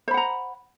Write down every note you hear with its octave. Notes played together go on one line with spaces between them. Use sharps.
C5 F#5 A#5 B5